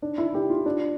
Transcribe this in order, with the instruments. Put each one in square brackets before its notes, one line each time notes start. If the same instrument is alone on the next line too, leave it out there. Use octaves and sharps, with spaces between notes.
[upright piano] D4
E4
G4
F4
D4